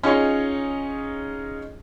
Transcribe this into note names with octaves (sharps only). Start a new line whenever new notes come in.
C#4 D#4 F4 G#4 C#5 D#5